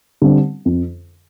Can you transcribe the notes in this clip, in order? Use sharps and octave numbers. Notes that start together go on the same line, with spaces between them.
D3 G3 C4
F2